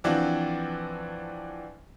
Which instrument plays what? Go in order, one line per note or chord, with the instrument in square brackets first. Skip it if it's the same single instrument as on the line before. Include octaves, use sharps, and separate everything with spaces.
[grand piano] E3 F3 C4 D4 F#4